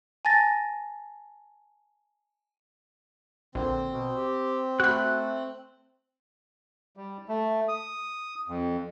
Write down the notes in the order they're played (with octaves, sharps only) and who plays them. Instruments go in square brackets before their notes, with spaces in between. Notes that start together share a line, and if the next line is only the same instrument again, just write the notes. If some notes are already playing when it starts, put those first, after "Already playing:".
[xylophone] G#5 A5 A6 A#6
[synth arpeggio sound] A#1 [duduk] D3 [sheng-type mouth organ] C4
[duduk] B2
G4
[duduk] A3 [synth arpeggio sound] F#4 B5 [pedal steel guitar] F#6
[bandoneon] G3
A3
D#6
F2